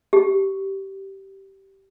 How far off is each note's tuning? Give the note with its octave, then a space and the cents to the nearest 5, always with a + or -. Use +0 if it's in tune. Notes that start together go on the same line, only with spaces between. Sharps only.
G4 -15